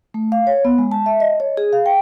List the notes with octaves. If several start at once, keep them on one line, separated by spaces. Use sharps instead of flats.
A3
F5
C#5
B3
G#3
A5
E5
D#5
C#5
G#4
F5
G5